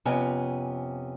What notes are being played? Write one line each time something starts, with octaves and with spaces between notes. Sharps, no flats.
F2 C3 B3 C#4 G#5